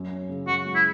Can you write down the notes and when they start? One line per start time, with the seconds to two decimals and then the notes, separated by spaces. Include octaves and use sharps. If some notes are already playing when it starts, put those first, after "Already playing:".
Already playing: F#2
0.11 C#4
0.29 C#3
0.47 F#2 F#4
0.65 G#3
0.75 E4